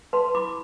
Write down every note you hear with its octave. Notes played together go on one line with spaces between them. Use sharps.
B4 A5 C6
E4 B5 D6